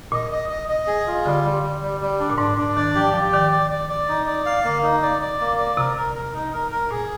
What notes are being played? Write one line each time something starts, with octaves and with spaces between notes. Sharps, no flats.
A#2 D#5
D#5
D#5
D#5
G#4
F4
D3 G3
G3
G3
G3
G3
D4
A#2
G#2 D4
A#2 D4
D#3 D5
F3 G4
F3 G4
D#3 D5
D5
D5
D5
D#4
D5
F5
D3 A#3
D#4
D5
D5
A#3
D5
C3 A#4
A#4
A#4
D#4
A#4
A#4
A#2 G#4